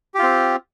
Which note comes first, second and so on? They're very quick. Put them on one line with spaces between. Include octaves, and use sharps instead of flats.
G4 F4 C4